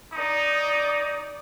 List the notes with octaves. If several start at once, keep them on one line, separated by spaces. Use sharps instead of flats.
D#4 D5 D#6